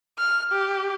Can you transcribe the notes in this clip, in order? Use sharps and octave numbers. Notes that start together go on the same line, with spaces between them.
F6
G4